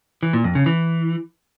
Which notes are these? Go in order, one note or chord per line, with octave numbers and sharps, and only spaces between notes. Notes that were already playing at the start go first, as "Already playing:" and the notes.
E3
A#2
F2
C#3
E3